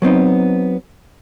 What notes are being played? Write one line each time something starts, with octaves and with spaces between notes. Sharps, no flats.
F#3 B3 C4 D#4